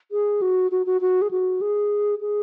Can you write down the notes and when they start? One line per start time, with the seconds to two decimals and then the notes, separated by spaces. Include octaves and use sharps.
0.12 G#4
0.42 F#4
0.71 F#4
0.86 F#4
1.01 F#4
1.22 G#4
1.31 F#4
1.61 G#4
2.21 G#4